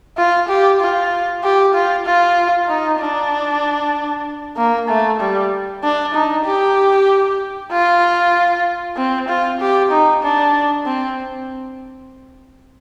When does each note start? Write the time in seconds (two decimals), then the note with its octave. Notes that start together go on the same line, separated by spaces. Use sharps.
0.17 F4
0.49 G4
0.81 F4
1.43 G4
1.74 F4
2.06 F4
2.69 D#4
2.99 D4
4.57 A#3
4.88 A3
5.20 G3
5.83 D4
6.14 D#4
6.45 G4
7.72 F4
8.97 C4
9.28 F4
9.60 G4
9.91 D#4
10.23 D4
10.86 C4